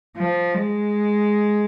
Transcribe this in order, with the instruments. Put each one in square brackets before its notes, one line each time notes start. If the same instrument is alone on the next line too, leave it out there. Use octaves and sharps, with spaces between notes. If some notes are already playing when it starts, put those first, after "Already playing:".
[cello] F3
G#3